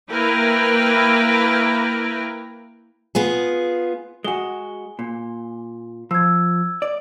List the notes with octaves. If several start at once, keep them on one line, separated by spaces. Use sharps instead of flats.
A#3 E4 A#4 B4 G5
B3 F4 G#4
G#3 F#4 G#5 G7
A#2
F3 E6 G#6
D5